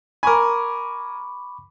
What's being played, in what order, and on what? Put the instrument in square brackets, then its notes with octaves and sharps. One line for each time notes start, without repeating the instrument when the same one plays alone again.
[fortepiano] A#4 G#5 [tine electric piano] B5 C#6 D6